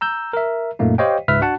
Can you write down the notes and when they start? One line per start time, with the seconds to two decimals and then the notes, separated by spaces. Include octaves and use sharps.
0.01 A#5 E6 G6
0.33 A#4 E5
0.79 F#2 A#2 A3 A#3 D#4
0.98 G4 C5 C#5 D#5 F5 G5
1.28 C#2 G#2 B4 E5 F6 B6
1.41 D4 F#4 F#5 A5